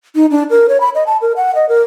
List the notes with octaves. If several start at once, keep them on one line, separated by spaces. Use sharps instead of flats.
D#4
D4
A#4
C#5
B5
D#5
A5
A#4
F#5
D#5
A#4